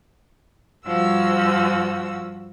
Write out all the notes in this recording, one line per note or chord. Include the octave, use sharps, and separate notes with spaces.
G2 F3 F#4 E6